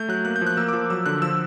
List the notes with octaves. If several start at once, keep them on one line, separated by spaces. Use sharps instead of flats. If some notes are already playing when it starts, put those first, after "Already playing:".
Already playing: A3 G6
F#3 F#6
A#3 F#6
G6
F3
F#6
A#3 E6
D6
F3
F#3 E6
D3 F#6
F3 E6